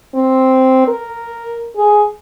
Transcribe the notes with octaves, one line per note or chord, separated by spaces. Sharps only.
C4
A#4
G#4